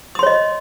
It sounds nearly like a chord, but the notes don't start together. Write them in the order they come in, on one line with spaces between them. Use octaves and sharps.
D#6 C6 C#5 D#5